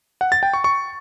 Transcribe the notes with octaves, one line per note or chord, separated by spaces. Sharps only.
F#5
A6
G5
C#6
C#6